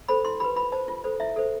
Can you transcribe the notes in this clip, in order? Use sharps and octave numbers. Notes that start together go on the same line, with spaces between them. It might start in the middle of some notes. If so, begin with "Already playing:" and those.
A4 C5 B5
E4 C6
G4 B4 B5
F4 B5
C5 A5
F4
A4 C5
E4 E5
A4 C5